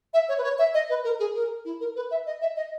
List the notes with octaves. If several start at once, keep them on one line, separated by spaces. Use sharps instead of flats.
E5
C#5
B4
C#5
E5
D#5
B4
A#4
G#4
A#4
E4
A#4
B4
E5
D#5
E5
D#5